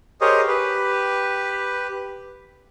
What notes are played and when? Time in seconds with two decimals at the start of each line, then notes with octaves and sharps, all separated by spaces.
0.21 G4 G#4 A#4 C5 C#5 D#5
0.48 G4 B4